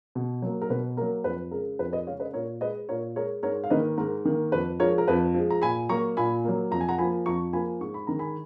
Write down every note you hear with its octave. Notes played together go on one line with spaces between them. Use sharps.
B2
F#3 A#3
A#4
B2 B4
F#3 A#3 A#4
F2 B4
C#3 G#3 A#4
F2 B4
B4 D#5
C#3 G#3 C#5 F5
B4 D#5
A#2 A#4 C#5
G#3 B4 D#5
A#2 A#4 C#5
G#3 A#4 C#5
G#2 A#4 C#5
F5
D#3 A#3 B4 D#5
G#2 A#4
D#3 A#3
F2 B4
F3 G#3 A#4 C#5
A#4
F2 B4
F3 G#3
A#5
A#2 G#5 B5
F#3 A#3 A#5 C#6
A#2 G#5 B5
F#3 A#3
F2 A#5
G#5
F#5 A#5
F3 A#3 G#5 B5
F2 A#5 C#6
F3 A#3 G#5 B5
G#2 C#6
B5
D#3 G#3 A#5
G#5 B5